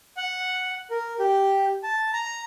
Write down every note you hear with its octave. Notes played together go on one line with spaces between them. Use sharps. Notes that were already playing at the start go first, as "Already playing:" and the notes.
F#5
A#4
G4
A5
A#5